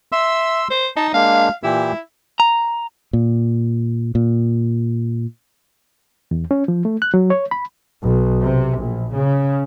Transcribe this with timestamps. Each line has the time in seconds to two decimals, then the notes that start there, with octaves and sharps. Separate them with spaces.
0.12 E5 C6 E6
0.70 C5
0.96 D#4 A5
1.14 G#3 A#3 D4 F5
1.63 A#2 E3 E4 G4
2.40 A#5
3.13 A#2
4.15 A#2
6.31 E2
6.51 C#4
6.68 F3
6.85 A3
7.02 F#6
7.14 F#3
7.30 C#5
7.51 B5
8.03 B1
8.42 C3
8.78 A#1
9.13 C#3